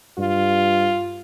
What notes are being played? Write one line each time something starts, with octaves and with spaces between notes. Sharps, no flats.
G2 F4